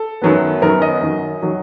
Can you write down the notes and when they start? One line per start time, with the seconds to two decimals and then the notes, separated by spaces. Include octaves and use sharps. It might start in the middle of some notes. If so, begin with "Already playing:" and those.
Already playing: A4
0.22 F#2 D#3 F#3 B3
0.62 F#2 D#3 F#3 B3 A#4
0.82 D#5
1.01 F#2 D#3 F#3
1.42 D#3 F#3